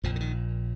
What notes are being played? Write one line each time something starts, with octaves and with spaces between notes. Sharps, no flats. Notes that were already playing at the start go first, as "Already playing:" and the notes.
A#1 F2 A#2 F3
D3
D#3